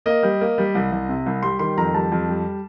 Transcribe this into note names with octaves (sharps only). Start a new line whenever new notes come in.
A#3 D#5
G3
A#3
G3
C2
C2
C3
C2
G3 C6
D#3 C6
F2 A#5
G3 A5
F2
G3